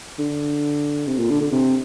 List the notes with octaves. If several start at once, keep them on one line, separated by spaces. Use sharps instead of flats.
D3
C3
A#2
D3
D3
C3